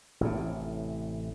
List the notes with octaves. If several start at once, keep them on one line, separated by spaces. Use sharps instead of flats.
A1 A2 C3